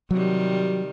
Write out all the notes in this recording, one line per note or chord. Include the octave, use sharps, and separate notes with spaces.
C3 D#3 F#3 G3